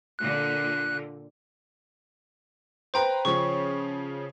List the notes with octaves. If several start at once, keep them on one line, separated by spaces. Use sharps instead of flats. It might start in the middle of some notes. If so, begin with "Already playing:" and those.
A#2 D3 F#6
B4 C5 G5 A#5 C6
C#3 F3 C#4 C#6